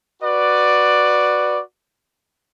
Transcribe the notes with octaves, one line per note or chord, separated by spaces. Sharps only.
F#4 B4 D5